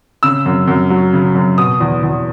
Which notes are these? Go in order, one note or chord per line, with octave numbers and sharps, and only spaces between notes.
C#3 E6
F#2
F#2
F#3
C#3
F#2
B2 D#6
E2
E2